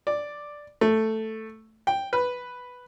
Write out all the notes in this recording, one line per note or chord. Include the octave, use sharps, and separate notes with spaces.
D5
A3
G5
B4